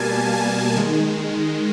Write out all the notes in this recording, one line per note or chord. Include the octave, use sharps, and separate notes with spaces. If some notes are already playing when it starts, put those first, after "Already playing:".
Already playing: B2 G3 A#3 G#5 A5
G#5
D#3 G#3